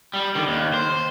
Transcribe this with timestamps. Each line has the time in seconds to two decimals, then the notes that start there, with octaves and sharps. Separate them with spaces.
0.14 G3
0.35 D3 D#3
0.48 D#2
0.74 C5